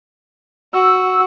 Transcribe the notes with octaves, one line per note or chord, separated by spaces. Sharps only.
F#4 E6